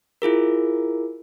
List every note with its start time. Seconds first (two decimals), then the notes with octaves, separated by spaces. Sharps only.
0.22 E4 F4 G#4 A#4